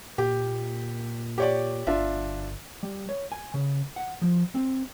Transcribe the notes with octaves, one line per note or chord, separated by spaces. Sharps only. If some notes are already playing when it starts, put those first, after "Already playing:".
A#2 G4
G4 C#5 D5
G1 D4 F4 E5
G3
C#5
G#5
C#3
F#5
F3
C4